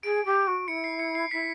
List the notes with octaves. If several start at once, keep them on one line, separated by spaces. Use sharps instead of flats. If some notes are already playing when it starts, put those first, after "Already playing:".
G#4 D7
G4
F#4
E4 C#7
C7
C#7
C7
E4 B6